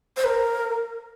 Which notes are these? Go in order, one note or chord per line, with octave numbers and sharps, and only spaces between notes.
C5
A#4